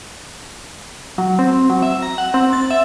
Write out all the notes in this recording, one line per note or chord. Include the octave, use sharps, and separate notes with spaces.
F#3
C4
F#3
E5
A#5
F#5
C4
A6
E5